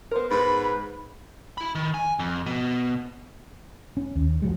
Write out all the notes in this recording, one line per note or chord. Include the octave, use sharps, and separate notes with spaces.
B3 A#4 C5
G#2 B4 B5
E4 B5
D#3
G#5
F2
B2
C#4
D#2
E2 F3 F#3 G#3